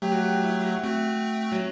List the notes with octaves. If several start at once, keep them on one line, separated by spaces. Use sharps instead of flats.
F#3 A3 G4
F#4
G4
F#4
E4
F#4
A3 C4 F#4
F#3